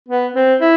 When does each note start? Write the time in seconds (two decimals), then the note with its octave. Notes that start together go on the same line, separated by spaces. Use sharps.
0.09 B3
0.36 C4
0.61 E4